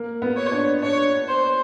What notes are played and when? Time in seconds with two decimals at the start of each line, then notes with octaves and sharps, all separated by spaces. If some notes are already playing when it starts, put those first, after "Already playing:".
Already playing: A#3
0.22 B3
0.37 C#5
0.52 D4
0.83 D4 C#5
1.28 C5